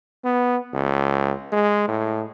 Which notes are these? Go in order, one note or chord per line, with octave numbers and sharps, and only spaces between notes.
B3
C#2
G#3
A2